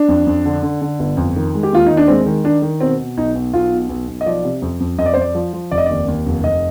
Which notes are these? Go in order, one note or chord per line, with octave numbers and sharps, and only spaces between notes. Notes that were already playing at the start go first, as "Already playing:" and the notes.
Already playing: D4
F2
F2
D3
D3
D3
G1
F2
D#3
G#3
G4
D#2 F4
D#2 D#4
D4
G#3 C4
D#3
D#3 D4
D#3
B2 C4
B2
B1 D#4
B1
B1 F4
B2
B1
B1
D#5
F3 D5
C3
F2
F2
F2 D#5
D5
C5
F2 D5
F3
F3
F1 D5
D#5
D#2 D5
D#2
F1
F1 D#5